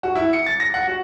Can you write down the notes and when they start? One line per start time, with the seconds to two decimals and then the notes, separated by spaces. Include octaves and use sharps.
0.03 F#4
0.15 E4
0.33 C#7
0.46 A6
0.60 A#6
0.74 F#5
0.87 F#4